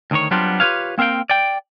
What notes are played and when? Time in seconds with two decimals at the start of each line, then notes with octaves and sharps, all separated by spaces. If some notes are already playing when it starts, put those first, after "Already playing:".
0.11 D2 D#3 C#5
0.31 F#3 G3 B3 C4 D4 F4
0.60 F4 G4 A4 B4 C#5 F5
0.98 A#3 C4 A#4 F5 G5
1.30 D5 G5